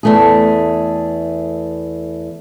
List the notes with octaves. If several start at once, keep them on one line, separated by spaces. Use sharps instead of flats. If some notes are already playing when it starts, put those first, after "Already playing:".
E2 A3 G#4